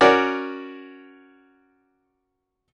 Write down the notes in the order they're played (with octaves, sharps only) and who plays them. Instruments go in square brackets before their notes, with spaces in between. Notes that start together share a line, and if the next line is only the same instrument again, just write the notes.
[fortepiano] C#4 F#4 A#4 D5